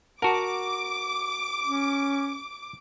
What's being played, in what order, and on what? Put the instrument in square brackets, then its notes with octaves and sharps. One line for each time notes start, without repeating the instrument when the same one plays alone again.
[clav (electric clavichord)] F#4 A#4 [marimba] F#5 A5 [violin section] D6
[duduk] C#4